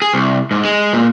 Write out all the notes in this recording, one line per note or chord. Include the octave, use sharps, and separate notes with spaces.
G#4
C2
G#2
G#3
A#2